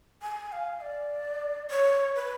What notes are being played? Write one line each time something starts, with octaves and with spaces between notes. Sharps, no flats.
G#5
F5
D5
C#5
B4